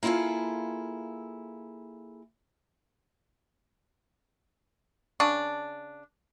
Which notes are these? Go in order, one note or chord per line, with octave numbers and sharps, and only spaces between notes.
A#3 E4 F4 G#4 A4
C#3 D4